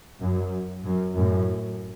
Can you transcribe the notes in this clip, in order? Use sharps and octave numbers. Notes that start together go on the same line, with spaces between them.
F#2
F#2
F#2 A2